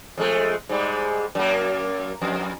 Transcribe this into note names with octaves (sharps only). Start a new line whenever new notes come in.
F2 G#3 A3
G#2 G3 G#3
F#2 A#3
F2